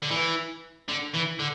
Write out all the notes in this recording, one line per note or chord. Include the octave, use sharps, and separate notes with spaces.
D3
E3
D3
E3
D3